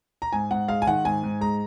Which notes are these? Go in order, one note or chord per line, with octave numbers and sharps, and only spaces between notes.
A#5
G#2 G#5
G#2 F#5
G#3 F5
G#5
D#3 F#5
G#2 G#5
G#2
G#3 A#5